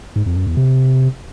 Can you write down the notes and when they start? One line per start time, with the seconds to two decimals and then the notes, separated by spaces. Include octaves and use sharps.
0.16 G#2
0.26 F2
0.36 F#2
0.47 E2
0.57 C3